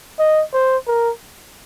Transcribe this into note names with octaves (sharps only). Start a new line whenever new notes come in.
D#5
C5
A#4